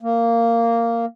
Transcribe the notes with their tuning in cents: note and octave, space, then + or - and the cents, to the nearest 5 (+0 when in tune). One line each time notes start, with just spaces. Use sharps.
A#3 -10